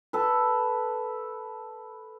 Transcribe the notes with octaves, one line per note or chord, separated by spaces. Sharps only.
A4 B4